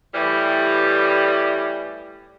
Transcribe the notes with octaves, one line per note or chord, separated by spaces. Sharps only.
A2 E3 G3